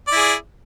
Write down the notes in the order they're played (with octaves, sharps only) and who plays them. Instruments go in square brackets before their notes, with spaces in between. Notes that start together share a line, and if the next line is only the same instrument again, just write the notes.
[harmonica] D5
E4
G#4